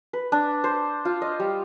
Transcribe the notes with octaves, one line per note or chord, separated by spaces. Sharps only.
B4
D4
C5
F4
D#5
G3